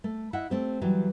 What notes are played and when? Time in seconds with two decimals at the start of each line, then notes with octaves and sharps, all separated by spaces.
0.04 A3
0.33 E4 D#5 E5 F#5
0.50 A3 C4 G4
0.81 E3 F#3 G3 G4